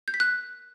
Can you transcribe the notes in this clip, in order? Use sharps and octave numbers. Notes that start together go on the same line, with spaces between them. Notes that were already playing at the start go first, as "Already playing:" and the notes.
G6
B6
F#6